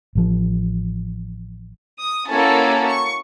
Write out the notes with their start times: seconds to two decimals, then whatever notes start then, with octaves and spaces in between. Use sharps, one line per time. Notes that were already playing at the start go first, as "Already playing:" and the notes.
0.15 A1 F3
2.00 D#6
2.29 A#3 C#4 E4 F#4 A4 G#5
2.87 C#6